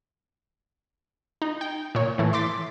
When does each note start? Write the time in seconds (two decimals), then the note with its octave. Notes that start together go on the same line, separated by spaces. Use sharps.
1.42 D#4
1.61 G5
1.95 A#2 C#5
2.18 A2 E3 A3
2.33 C6 D6 A6 B6